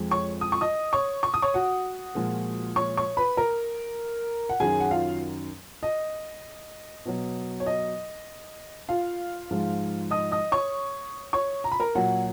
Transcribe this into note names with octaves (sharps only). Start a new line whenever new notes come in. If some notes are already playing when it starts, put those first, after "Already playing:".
Already playing: F2 F3 G#3
C#5 C#6
D#6
C#6
D#5 D#6
C#5 C#6
C#6
D#6
C#5 C#6
F#4 F#5
A#2 F3 G#3
C#5 C#6
C#5 C#6
B4 B5
A#4 A#5
F#5
F#2 D#3 F#3 G#4 G#5
F#5
F4 F5
D#5
B2 F#3
C#5
D#5
F4 F5
G#2 F3 G#3
D#5 D#6
D#5 D#6
C#5 C#6
C#5 C#6
A#5
B5
A#4 A#5
A#2 F#3 F#4 F#5